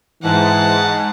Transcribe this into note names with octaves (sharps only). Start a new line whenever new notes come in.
G#2 E3 F#5 A5